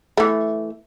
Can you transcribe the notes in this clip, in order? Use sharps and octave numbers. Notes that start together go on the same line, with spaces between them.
E3 A3